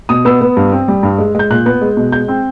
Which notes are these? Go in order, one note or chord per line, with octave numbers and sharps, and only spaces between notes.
B2 D#6
B3 E6
B3
G2
C4
G3
G2
G#3
G#3 G6
A#2 F#6
B3 F#6
G#3
B2
G#3 G6
C4